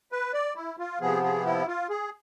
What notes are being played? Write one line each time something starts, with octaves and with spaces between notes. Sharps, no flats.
B4
D5
E4
F4
C3 F3 B3 G#4
G#4
E4
F4
G#4